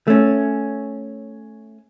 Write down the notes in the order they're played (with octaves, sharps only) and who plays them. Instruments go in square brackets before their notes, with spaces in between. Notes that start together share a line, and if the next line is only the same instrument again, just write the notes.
[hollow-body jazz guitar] A3 C#4